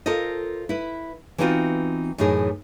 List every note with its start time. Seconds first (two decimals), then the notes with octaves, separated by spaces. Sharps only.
0.06 F4 A4 A#4 C5 D#5
0.69 E4 B4
1.38 E3 B3 C4 D#4 F4 F#4
2.18 F#2 A2 E3 D#4 G#4